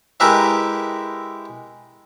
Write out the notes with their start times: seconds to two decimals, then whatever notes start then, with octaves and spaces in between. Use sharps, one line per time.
0.20 G#3 E4 G4 A#4 B4 E5